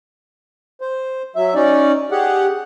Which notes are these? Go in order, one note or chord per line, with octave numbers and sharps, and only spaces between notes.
C5
F#3 E5
C#4 D#4 D5
G4 G#4 F#5